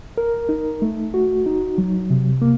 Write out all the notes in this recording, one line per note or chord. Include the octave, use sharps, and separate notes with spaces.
A#4
D#4
A3
F#4
D#4
F#3
C3
A#3